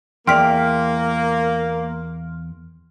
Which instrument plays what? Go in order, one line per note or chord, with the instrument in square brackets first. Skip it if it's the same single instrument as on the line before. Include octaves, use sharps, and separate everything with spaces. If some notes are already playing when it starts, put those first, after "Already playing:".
[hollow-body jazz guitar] E2 D5 [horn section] A#3 [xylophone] G5 B6 [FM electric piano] C6 F6